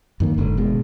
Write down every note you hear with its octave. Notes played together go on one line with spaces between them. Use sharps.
F#2 D#3 A#3
F#1 G#2 D3
B2 G#3